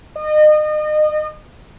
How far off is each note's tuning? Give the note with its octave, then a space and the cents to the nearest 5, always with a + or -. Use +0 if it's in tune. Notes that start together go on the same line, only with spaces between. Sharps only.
D#5 -35